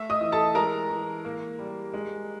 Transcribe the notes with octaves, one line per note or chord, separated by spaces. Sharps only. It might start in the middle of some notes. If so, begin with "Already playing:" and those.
Already playing: A3 E5 E6
D#5 D#6
E3
A4 A5
G#3 A#4 A#5
E3
A#3
G3
G#3